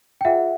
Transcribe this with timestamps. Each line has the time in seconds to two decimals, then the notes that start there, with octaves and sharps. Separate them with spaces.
0.21 G5
0.25 F4 G#4 C5 E5 F#5